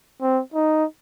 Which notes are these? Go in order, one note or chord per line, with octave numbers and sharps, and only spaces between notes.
C4
D#4